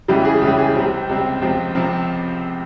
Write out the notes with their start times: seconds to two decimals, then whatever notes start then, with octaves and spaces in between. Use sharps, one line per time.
0.08 C#2 C#3 E3 G3 G4
0.25 G#4
0.41 C#2 C#3 E3 G3 G4
0.58 G#4
0.75 C#2 C3 G3 C4 G4
1.09 C#2 C3 G3 C4
1.41 C#2 C3 F3 C4 G4
1.75 C3 F3 C4